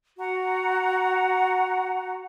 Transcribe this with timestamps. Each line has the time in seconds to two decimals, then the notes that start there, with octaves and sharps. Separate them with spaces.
0.18 F#4 F#5 A#5